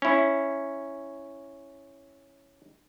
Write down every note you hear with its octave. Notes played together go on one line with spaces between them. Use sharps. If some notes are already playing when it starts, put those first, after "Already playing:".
C#4 E4